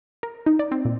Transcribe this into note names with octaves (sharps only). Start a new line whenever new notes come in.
A#4
D#4
D5
C4
A#2